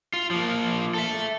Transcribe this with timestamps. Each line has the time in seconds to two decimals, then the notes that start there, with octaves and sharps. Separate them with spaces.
0.13 F4
0.31 F3 A#3
0.94 A4 E5